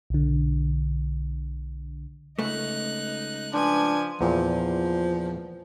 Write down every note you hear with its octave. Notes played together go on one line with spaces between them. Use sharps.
B1 D3
C#2 A3 D#4 F#6
F3 D4 B4 G#5
E2 A#2 F3